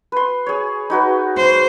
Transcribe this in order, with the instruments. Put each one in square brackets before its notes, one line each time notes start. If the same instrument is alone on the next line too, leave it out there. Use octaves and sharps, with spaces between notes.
[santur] B4 C6
G#4 C#5
D#4 F#4 B4
[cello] C5